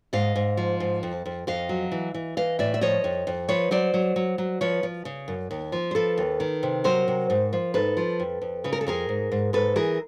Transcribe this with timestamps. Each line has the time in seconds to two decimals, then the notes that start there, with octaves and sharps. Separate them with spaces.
0.13 G#2 D#5 F5
0.36 G#2
0.57 F3
0.80 G#2
1.03 F2
1.26 F2
1.47 F2 D#5 F5
1.69 F#3
1.92 E3
2.14 E3
2.37 E3 D#5 F5
2.59 A2 D5 E5
2.74 E5
2.81 F3 C#5 D#5
3.04 F2
3.27 F2
3.48 F3 B4 C#5
3.71 F#3 C5 D5
3.94 F#3
4.16 F#3
4.38 F#3
4.61 F3 B4 C#5
4.83 F3
5.05 C#3
5.28 F#2
5.51 D#2
5.72 F3
5.91 C5
5.95 F3 A4 B4
6.18 D#2
6.40 D#3
6.63 C3
6.84 F#3 A#4 C5
7.08 C3
7.30 G#2
7.53 F3
7.74 G#2 A4 B4
7.97 F3
8.20 F2
8.42 F2
8.64 C#3 B4
8.73 A#4
8.81 A4
8.87 F2 G#4 A#4
9.09 G#2
9.32 G#2
9.53 G#2 A4 B4
9.76 E3 G#4 A#4